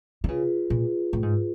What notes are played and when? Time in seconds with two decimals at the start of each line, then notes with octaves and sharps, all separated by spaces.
0.24 D3
0.28 C#3 F4 G#4 B4
0.70 A#2
1.13 A2
1.23 G#2